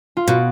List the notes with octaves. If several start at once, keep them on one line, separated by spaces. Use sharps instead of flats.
F4
B2 F#4